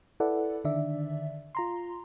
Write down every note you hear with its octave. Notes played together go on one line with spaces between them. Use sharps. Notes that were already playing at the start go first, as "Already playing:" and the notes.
E4 A4 B4 D5 F#5
D3 D#3 D4 D5 E5
F4 A#5 C6